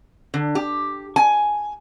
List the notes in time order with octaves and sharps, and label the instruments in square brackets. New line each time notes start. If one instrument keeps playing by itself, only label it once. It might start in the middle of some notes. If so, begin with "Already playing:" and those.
[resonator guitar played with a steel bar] D3
G4
G#5